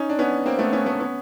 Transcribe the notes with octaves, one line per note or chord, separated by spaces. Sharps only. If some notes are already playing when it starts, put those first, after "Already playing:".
Already playing: C#4 D#4
D4
B3 C#4
A#3 C4
A3 B3
B3 C#4
A3 B3
B3 C#4